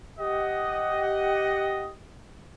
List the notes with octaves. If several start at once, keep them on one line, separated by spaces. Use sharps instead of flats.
G4 D#5 F#5